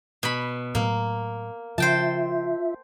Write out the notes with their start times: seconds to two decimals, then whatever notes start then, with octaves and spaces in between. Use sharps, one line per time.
0.23 B2 B5
0.75 A2 F#3 A#3
1.78 C#3 F3 F4 C5 E5 G5 A5